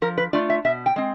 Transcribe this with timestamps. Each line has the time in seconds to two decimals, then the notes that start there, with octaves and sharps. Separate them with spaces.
0.02 F3 A#4
0.18 B4
0.33 A3 D4 F4 D5
0.50 E5
0.65 B2 E5
0.86 G5
0.96 G#3 C4